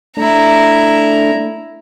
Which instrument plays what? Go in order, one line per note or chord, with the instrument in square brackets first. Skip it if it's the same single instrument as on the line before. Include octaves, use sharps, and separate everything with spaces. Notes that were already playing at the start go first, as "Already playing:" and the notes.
[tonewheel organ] A3 D4 [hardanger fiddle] E4 A#5